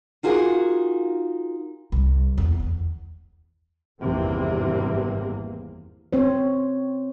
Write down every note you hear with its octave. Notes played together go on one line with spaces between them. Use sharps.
D#4 F4 F#4 G#4 A#4 F5
C2
E2
E2
G#1 E2 G2 C3 E3 A#3
C4 C5 C#5